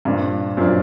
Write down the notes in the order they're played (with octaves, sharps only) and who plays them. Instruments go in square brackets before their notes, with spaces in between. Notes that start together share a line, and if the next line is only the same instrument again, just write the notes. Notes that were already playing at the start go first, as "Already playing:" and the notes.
[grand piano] G2 [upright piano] A#2 F3 A#3 D4
[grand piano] F#2 [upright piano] A#2 F3 A#3 D4